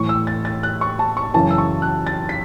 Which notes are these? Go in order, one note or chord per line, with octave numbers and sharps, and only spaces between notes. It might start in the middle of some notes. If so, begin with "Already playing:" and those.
Already playing: A2 E3 C#6
E6
A6
A6
F#6
C#6
A5
C#6
F#2 C#3 E3 A5
E6
C#6
F#6
A6
B6